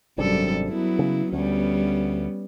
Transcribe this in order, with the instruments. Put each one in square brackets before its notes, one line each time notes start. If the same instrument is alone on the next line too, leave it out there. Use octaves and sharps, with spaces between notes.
[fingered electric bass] G#1 C3 D4 [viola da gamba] F#2 G3 A4
[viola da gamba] F#3 B3 E4
[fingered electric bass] C#3
[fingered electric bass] D2 [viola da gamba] G3 B3 C#4